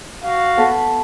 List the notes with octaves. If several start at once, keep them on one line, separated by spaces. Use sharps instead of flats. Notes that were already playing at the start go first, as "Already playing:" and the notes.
F#4 F5
B3 A4 B5